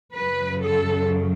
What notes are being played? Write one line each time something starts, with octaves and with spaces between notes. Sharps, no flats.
F#2 C#3 F#3 B4
A4